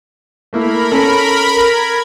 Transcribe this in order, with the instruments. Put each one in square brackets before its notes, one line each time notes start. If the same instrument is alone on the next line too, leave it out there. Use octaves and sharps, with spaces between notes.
[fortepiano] A3 A#3 E4 [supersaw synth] A#4 B5
[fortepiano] C#4 A4
[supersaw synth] G#6